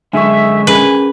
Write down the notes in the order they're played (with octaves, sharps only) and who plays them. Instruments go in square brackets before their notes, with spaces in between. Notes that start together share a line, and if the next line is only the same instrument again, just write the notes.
[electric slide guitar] F#2 D3 G#3 [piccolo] E5 [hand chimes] G#5 C#6
[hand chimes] C#4 G#4 A#4 [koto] B4 [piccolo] G#5